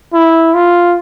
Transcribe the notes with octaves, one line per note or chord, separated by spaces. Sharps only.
E4
F4